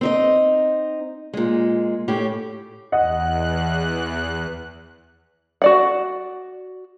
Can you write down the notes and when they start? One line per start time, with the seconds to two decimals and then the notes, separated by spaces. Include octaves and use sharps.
0.01 C4 D#4 D#5
1.34 A#2 G#3
2.08 A2 C#4 G4
2.92 E2 D#5 F#5 F#6
5.62 F#4 D5 F#5